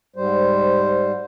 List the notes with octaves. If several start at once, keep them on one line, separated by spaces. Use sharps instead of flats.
G#2 G3 C5